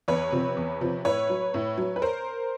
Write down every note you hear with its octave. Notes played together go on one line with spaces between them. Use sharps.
E2 B4 C#5
C3 F3
E2
C3 F3
A2 B4 C#5
F#3
A2
F#3
B4
A#4 C5